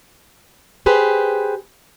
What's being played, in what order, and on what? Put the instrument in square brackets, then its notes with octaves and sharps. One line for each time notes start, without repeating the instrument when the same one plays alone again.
[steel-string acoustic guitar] G4 G#4 B4 C5